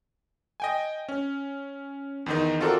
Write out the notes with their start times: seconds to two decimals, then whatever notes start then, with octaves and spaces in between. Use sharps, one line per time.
0.60 D#5 G5 G#5
1.09 C#4
2.26 E2 D#3 D#4
2.60 C4 F4 F#4 A4 A#4 D5